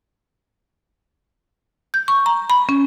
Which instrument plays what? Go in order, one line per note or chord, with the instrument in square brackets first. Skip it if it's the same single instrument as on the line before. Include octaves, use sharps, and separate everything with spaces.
[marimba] G6
C#6
A#5
B5
C#4